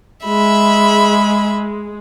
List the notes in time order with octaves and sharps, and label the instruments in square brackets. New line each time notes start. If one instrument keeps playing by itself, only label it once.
[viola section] G#3 [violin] E5 B5